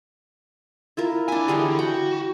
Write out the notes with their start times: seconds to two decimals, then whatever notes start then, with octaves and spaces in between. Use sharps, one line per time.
0.97 E4 F4 A#4
1.28 C#2 D4 E4 G#5
1.48 D3 E3 G3 G#4
1.79 F#4 G5